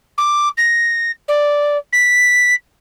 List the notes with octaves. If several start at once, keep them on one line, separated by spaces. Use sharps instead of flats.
D6
A#6
D5
B6